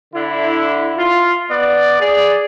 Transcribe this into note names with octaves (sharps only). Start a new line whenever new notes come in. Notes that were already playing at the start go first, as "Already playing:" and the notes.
D3 E4
F4
B3 D5
G#4 D5